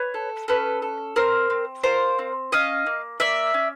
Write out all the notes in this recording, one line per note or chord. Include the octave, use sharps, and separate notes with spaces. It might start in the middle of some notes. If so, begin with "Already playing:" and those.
Already playing: B4 C#5
A4
C#4 A4 B4
A4
C4 A#4 C5
C4
F4 A#4 C5
C4
C#4 D#5 F5
A#3
A#3 D5 E5
C#4